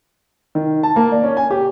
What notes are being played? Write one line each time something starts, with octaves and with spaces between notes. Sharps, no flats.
D#3
A5
A#3
D5
C#4
G#5
G4